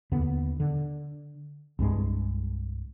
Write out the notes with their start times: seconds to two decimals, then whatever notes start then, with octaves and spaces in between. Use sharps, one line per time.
0.12 D#2 D3 B3
0.60 D3
1.79 C2 G2 G#3